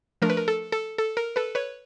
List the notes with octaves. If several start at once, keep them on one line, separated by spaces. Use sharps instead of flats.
F3 A3 D4 A#4
B4
A#4
A4
A4
A4
A#4
A4 B4
B4 C#5